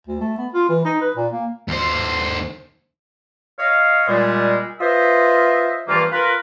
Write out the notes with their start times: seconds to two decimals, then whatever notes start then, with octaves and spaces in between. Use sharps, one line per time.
0.07 D2
0.21 A3
0.38 B3
0.53 F4
0.69 E3
0.85 D#4
1.01 B4
1.16 A#2
1.32 A#3
1.68 D#2 C5
3.59 C#5 D#5 F5
4.08 A#2 G3 G#3
4.80 F4 B4 C5 D#5 E5
5.88 G2 E3 F3 A3 A#3 F4
6.11 F4 A#4 B4